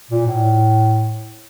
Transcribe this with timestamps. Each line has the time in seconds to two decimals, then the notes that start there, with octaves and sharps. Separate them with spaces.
0.11 A#2
0.26 A2